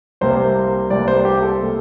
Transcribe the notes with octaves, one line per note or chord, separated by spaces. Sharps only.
C2 C3 G3 A#3 C5
C2 C3 G3 A#3 D5
C5
G4
A4
C3 G3 A#3